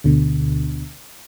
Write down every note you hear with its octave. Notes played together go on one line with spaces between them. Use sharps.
D2 B2 D3